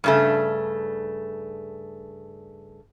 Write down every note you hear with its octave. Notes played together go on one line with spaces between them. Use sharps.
G2 C#3 A3